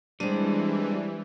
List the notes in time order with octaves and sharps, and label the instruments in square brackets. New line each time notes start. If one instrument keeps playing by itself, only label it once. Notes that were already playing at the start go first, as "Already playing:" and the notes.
[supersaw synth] E3 [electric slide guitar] G3 [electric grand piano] G#3 D#7 [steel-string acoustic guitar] C4 D4